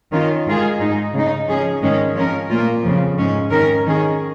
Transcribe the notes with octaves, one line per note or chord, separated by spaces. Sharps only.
D#3 C#4 F4
G#2 D#3 G#3 F4 G#4
G#2 G#3 D#4
C#3 G#3 D#4
F3 C#4 G#4
G#2 D#3 G#3 C#4
F3 C#4 A#4
A#2 A#3 F4
F2 C#3 F3
G#2 G#3 C#4
D#3 C#4 A#4
D#3 C#4 G#4